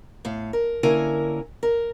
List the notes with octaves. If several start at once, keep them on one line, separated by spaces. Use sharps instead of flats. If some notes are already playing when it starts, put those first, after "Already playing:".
A2 F5
A#4
D3 A#3 C#4 E4 A#4 G#5
A#4